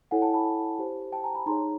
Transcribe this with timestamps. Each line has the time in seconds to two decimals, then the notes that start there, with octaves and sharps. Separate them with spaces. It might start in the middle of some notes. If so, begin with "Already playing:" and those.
0.11 E4 A4 C#5 F#5 G#5
0.22 G5 A5
0.34 A5 B5
0.79 G4 C5
1.13 G5 A5
1.24 G#5 A#5
1.35 A5 B5
1.46 D#4 G#4 C#5 A#5 C6